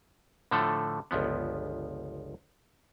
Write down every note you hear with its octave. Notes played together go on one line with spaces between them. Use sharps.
A2 D3 F3 A3 A4
G1 C#2 F3 B3